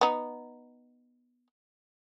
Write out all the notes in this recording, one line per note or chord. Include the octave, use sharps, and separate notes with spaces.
B3 D#4